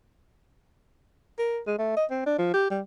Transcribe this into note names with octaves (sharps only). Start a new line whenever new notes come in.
A#4
G#3
A3
D#5
C4
D4
F3
G4
G3